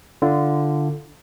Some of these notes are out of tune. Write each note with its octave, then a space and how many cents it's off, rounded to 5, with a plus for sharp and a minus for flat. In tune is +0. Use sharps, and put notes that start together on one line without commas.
D3 +0 F4 -25